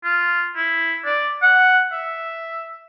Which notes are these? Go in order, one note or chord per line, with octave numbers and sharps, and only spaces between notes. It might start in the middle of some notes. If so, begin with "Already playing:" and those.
F4
E4
D5
F#5
E5